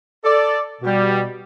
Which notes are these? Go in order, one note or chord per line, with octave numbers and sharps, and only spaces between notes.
A4 D5
B2 G3